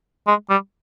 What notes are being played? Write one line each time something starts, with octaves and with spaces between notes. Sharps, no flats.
G#3
G3